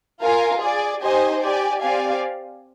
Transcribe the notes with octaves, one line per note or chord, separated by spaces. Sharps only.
F4 A#4 F5 G#5
G#4 D5 G#5
D#4 G4 C5 D#5 G#5
G4 D5 G#5
C4 G4 D5 F5 G#5